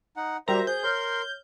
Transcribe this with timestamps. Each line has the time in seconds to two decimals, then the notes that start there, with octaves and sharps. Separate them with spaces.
0.17 D#4 F#5
0.48 G3 F#4 A#4 C5 E5 A#5
0.67 G#4 C5 G6
0.83 A#4 C#5 C6 F6